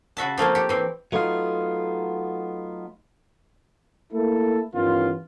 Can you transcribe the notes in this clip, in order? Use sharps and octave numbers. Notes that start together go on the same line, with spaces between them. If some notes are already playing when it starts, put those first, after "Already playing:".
C#3 F#4 E5 A5
F3 A3 A#3 C4
G4
E3 C4
F#3 A3 B3 D#4 F4
A3 A#3 E4 A4
G2 D#3 E3 B3 C#4 F4